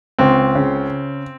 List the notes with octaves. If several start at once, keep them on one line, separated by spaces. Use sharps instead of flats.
C#2 C4
C#3